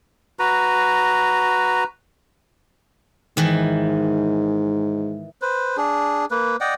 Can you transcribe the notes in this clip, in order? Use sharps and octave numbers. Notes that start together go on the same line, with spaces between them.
F#4 B4 A#5
G#2 D#3 E3
B4 C5
D4 G#4
A#3 B4
D5 D#5 F#5 G5